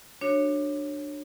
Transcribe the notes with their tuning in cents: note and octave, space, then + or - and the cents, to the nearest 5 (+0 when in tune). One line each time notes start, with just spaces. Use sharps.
D4 +10 F#4 +0 C#5 -10